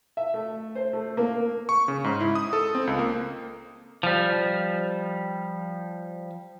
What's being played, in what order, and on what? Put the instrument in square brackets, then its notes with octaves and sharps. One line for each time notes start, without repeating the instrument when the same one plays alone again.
[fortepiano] E5
A3
C5
A3
A#3
[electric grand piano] C#6
C#3
G#2
E4
D#6
A4
C4
C#2
A#3
[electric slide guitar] F3 G3